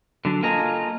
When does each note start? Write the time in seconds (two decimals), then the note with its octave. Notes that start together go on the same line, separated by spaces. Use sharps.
0.25 D3 F#3 D4
0.43 A#3 F4 A4 D#5 G#5 A#5